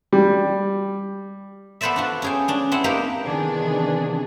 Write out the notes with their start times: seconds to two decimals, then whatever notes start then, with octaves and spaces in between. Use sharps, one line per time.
0.13 G3
1.81 B3 A4 B4 C5 D5 E5
1.96 D4 F4 F#4
2.22 C#4 G#4 G5
2.48 C#4 D4
2.72 C4 E4 F#5
2.84 A#3 D#4 G4 A#4 B4 G5
3.23 C3 D#3 E3 B3 D4 G#4